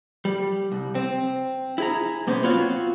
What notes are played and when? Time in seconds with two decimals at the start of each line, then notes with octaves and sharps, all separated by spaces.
0.25 G3
0.72 C2
0.95 C4
1.78 E4 G#4 A#5
2.27 B1 A#3 B3 C#4 C5
2.43 B3 C4 F4 F#4 C#5 F5